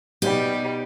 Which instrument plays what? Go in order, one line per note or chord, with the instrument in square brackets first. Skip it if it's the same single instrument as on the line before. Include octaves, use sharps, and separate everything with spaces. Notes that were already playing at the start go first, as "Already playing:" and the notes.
[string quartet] B2 G3 [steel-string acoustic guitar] D#4 G4